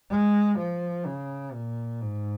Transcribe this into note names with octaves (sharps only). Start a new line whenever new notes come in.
G#3
F3
C#3
A#2
G#2